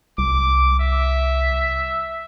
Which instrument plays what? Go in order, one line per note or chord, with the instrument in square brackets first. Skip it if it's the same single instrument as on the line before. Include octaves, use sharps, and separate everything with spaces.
[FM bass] C2 [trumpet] D6
[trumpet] E5